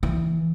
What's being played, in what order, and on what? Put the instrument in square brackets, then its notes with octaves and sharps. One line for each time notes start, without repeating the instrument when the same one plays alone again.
[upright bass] E3